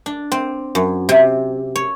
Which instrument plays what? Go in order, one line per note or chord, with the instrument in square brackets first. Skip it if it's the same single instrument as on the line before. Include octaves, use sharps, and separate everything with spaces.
[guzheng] D4
C4
F#2
C3
C#5